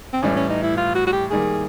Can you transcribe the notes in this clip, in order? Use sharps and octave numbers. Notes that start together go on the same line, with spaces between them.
C4
A2 E3 G3 C#4
C#4
D#4
E4
F4
F#4
F#4
G4
D#3 G3 A#3 G#4